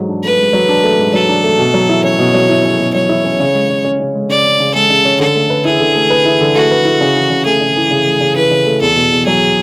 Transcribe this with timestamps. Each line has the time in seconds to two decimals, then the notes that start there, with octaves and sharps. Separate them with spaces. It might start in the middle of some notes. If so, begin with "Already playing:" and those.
Already playing: G#2 F#3
0.09 D4
0.24 A3 B4
0.39 G#2
0.53 F#3
0.69 D4
0.83 A3
0.99 G#2
1.13 F#3 A4
1.29 D4
1.43 A3
1.59 B2
1.74 F#3
1.89 E4
2.04 C#4 C#5
2.19 B2
2.34 F#3
2.49 E4
2.64 C#4
2.79 B2
2.94 F#3 C#5
3.09 E4
3.24 C#4
3.40 C#3
3.54 G#3
3.70 C#3
3.84 C#4
4.00 C#3
4.14 G#3
4.29 C#3 D5
4.45 C#4
4.60 C#3
4.75 G#3 A4
4.90 C#3
5.05 C#4
5.20 D3 A4
5.35 A3
5.50 B4
5.65 E4 G#4
5.80 D3
5.95 A3
6.10 B4
6.25 E4
6.41 D3
6.55 A3 F#4
6.71 B4
6.85 E4
7.01 C#3
7.16 E3
7.30 C#3
7.45 A3 G#4
7.61 C#3
7.76 E3
7.91 C#3
8.06 A3
8.21 C#3
8.36 E3 B4
8.51 C#3
8.66 A3
8.81 E2 A4
8.96 B2
9.11 E2
9.26 F#3 G#4